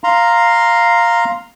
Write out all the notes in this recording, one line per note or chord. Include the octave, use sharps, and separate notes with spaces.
F5 A#5 C6